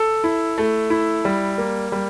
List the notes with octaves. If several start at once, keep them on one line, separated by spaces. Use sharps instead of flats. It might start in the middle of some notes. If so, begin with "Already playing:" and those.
Already playing: A4
E4
A3
E4
G3
A#3
G3